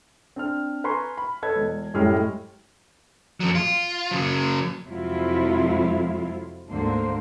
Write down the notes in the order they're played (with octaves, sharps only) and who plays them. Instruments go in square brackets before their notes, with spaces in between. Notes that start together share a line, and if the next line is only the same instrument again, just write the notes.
[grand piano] C4 D4 F6
B4 G#5 A#5 C6 C#6
B5
A4 B4 C#5 D#5 G#6
E1
F#2 A2 G3 G#3 G4 F6
[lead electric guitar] F2 F#3
F4
C#3 F#3
[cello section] F2 C3 F#3 G#3 E4 F4
D2 G#2 D3 A#3 C5